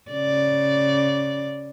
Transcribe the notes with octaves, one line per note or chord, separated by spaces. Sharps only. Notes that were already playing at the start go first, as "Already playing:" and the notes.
C#3 D5